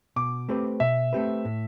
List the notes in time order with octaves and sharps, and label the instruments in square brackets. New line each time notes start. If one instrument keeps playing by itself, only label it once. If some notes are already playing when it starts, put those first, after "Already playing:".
[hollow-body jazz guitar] B2 [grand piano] D6
[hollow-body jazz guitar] A3 C4 G4 B4
[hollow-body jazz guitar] B2 [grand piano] E5
[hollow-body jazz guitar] A3 C4 G4 B4
A2